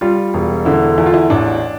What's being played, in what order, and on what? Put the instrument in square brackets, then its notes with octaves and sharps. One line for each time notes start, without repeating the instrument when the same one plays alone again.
[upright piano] G3 [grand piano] F4
[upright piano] E1
[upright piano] D3 [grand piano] E4
[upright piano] E2 [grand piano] E4
[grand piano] F4
E4
[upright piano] A1 [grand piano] D4